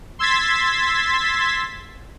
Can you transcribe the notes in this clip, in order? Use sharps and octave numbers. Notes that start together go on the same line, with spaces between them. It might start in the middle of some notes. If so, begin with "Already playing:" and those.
C6 E6 G#6 A6 B6